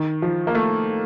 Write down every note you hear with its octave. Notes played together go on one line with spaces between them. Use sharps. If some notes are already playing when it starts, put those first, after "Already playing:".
Already playing: D#3
F3
A#3
A3